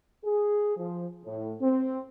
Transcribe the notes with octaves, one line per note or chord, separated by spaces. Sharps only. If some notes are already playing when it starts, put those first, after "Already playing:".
G#4
F3
A2
C4